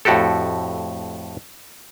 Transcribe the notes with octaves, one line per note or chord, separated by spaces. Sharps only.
F2 A2 F#4 G4 A4